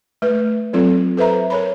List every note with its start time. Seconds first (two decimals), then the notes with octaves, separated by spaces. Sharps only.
0.22 A3 B4
0.73 F#3 C4 F4 A4
1.17 A4 B4 C5 E5 A#5
1.50 A#4 C#5 B5